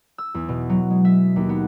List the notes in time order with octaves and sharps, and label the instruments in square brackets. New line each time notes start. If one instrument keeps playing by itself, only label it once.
[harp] E6
E2
B2
F#3
G#3
E5
D#2
B3